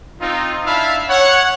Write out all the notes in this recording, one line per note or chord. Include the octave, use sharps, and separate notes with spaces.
C4 D#4 F4
D4 E4 E5 F5 A5 B5
C#5 F#5